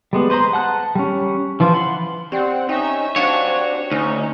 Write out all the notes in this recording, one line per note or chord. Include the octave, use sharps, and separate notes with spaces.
G3 G#3 B3
B4 C5 D#5 A#5 C6
F#5 A5 F#6
G3 C#4
E3 F3 F4 C5
F#5 B5 C6
C4 G4 D5 F#5 G5
C#4 D#4 E5 G5
C4 D4 F#4 G4 C#5 F5
D2 C#4 D#4 C#5